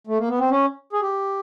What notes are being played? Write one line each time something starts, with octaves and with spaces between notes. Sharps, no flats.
A3
A#3
B3
C4
C#4
G#4
G4